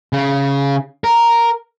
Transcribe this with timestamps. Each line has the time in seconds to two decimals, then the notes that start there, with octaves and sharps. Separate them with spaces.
0.13 C#3
1.04 A#4